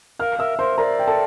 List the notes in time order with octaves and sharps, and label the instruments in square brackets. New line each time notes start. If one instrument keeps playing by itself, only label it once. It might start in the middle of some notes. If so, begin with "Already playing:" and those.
[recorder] A#4 [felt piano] F5 F6
[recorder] A#4 [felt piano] E5 E6
[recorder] A#4 [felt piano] C5 C6
[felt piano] A#4 A#5 [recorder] D5
[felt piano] G5
A4 A5